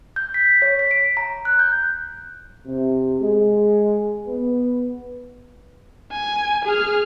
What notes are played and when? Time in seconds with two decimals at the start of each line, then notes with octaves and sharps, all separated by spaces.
0.16 G6
0.34 B6
0.62 C#5
0.79 B6
0.91 D7
1.17 A#5
1.45 F#6
1.59 G6
2.65 C3
3.20 G#3
4.27 B3
6.13 G#5
6.66 G#4 F6